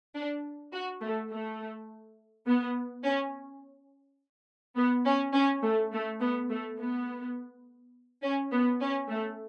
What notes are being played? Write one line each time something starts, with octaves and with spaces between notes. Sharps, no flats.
D4
F#4
A3
A3
B3
C#4
B3
C#4
C#4
A3
A3
B3
A3
B3
C#4
B3
C#4
A3